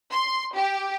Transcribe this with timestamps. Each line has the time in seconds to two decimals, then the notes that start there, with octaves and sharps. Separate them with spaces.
0.12 C6
0.57 G4